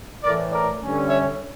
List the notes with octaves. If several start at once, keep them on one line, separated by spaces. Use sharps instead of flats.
A2 E3 A3 A#4 D5
A#4 D5
G2 D3 G3 C#4
C#5 E5